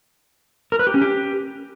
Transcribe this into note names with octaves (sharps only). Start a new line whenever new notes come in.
A#4
B4
G4
C#4
G4